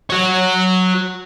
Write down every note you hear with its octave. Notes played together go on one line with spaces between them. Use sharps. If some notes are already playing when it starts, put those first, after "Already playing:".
F#4 C#5